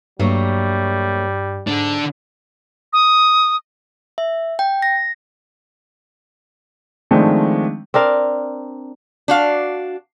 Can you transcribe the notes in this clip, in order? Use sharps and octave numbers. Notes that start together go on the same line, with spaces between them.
G2 F#3 G3 A3 A#3
G#2 D3 D4
D#6
E5
G5
A#6
D#3 F3 G#3 A3 C4 D4
C4 D4 A#4 F5
D4 F#4 F5